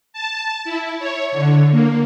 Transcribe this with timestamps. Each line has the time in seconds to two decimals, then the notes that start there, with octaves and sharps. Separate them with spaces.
0.13 A5
0.64 E4
0.99 C#5
1.32 D3
1.71 A#3